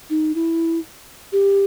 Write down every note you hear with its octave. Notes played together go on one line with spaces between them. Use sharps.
D#4
E4
G4